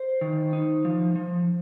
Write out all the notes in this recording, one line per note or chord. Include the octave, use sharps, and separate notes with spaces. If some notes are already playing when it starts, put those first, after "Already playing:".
Already playing: C5
D#3
D#4
F3
F3